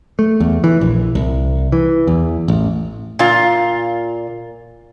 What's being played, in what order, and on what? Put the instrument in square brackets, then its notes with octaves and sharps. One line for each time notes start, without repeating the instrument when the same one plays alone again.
[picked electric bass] A3
E2
E3
A#1
C2
E3
E2
A1
[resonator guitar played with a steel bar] A#2 F4